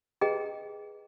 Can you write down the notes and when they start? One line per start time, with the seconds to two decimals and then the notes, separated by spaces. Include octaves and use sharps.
0.21 G#4 B4 D#5 G5 A#5